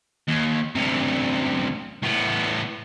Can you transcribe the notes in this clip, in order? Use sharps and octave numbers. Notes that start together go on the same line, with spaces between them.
D#2
D2 C3
A2 B3